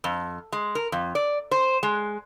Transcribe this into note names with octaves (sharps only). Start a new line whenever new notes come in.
F2
G#3
A#4
F2
D5
C5
G#3